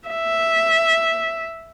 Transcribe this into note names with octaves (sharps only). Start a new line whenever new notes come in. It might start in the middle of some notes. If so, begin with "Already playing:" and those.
E5